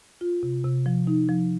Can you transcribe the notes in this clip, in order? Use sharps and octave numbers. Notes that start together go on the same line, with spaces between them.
F4
C3
C3
F3
D#4
F3